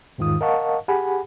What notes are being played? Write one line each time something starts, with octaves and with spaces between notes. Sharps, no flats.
E2 G#2 D#3 F4 D#6
A#4 D#5 F5 F#5 A5 C#6
G4 G#4 F#5 G#5 B5